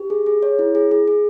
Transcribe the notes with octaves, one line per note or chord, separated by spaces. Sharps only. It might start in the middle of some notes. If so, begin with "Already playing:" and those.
Already playing: G4
G#4
G#4
C#5
E4
G#4
G#4
G#4